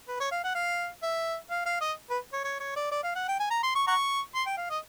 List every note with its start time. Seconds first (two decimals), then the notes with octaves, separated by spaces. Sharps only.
0.08 B4
0.20 C#5
0.31 F5
0.44 F#5
0.55 F5
1.03 E5
1.50 F5
1.66 F5
1.81 D#5
2.10 B4
2.33 C#5
2.44 C#5
2.60 C#5
2.76 D5
2.91 D5
3.03 F5
3.16 F#5
3.28 G5
3.40 G#5
3.51 A#5
3.63 C6
3.75 C#6
3.87 F#5 A#5 C#6
4.35 C6
4.46 G5
4.57 F5
4.70 D#5